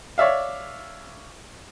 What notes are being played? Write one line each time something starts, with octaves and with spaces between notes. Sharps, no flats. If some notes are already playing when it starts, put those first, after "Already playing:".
C#5 D5 E5 F5